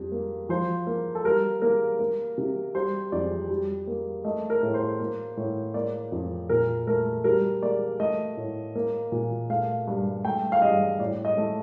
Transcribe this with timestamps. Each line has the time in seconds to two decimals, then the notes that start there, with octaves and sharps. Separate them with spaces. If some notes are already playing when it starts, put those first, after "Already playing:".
Already playing: F2 G3
0.12 A#3
0.49 F3 C5
0.87 A#3
1.15 A4
1.24 G3 A#4
1.61 A#3 A#4
1.99 A#3
2.38 C3
2.75 G3 C5
3.12 F2 D5
3.50 G3
3.87 A#3
4.24 A3 D#5
4.50 A#4
4.63 A2
4.74 C5
5.00 A#3
5.37 A2
5.74 A#3 D5
6.12 F2
6.49 A#2 A#4
6.87 A3 A#4
7.24 G3 A#4
7.62 A#3 D5
8.00 A3 D#5
8.37 A2
8.75 A#3
9.12 A#2
9.50 A3 F5
9.87 G2
10.24 A3 G5
10.52 F5
10.62 G2 D#5
11.00 A2 D5
11.25 D#5
11.37 A3